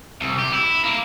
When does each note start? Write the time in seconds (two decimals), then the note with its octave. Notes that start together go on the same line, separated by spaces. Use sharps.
0.21 C2
0.39 G4
0.53 E4
0.84 A#3